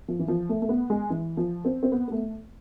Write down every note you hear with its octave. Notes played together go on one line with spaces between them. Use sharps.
F3
E3
F3
A3
A3
B3
G#3
E3
F3
C4
C4
B3
B3
A3